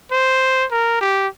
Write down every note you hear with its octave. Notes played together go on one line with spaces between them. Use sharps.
C5
A#4
G4